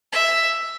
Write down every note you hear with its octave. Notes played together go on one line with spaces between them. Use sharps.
E5